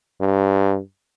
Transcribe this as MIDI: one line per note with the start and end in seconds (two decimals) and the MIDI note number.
0.20 0.79 43